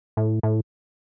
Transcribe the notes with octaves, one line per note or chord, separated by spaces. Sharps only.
A2
A2